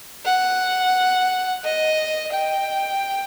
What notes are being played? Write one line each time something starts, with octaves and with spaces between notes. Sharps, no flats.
F#5
D#5
G5